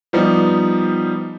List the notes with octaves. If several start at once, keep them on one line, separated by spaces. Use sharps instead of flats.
F3 G3 B3 D#4